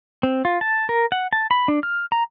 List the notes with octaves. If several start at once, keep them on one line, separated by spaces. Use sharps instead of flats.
C4
F4
A5
A#4
F#5
A5
B5
D4
F6
A#5